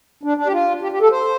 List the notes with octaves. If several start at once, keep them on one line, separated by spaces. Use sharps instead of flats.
D4
D4
G4
F4
G4
G4
A4
C5